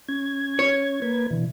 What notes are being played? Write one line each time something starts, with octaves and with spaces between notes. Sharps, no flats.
C#4 G#6
C#5
A#3 B4 G#6
B2 D3 E3